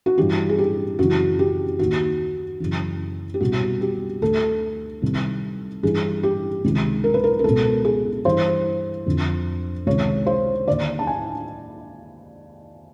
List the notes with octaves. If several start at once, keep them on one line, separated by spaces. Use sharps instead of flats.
F#4
G2 E3 G4
G#4
G4
F#2 C#3 E3 F#4
G4
D#2 D#3 F#4
F#2 C#3 E3
G4
C2 B2 F#4
G4
D2 D3 A4
C2 C3 D#3
G2 E3 G#4
G4
C#2 C3 D#3
A#4
B4
A#4
A#4
C#2 B2 A4
G#4
G2 E3 C5
F2 D3
C#2 C3 D#3 C#5
C5
D#2 D3 D5
A5
G#5